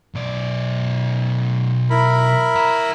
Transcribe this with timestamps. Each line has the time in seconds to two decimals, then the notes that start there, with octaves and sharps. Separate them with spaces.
0.15 B1 D5
1.90 E4 A#4 B5
2.56 F#5 A#5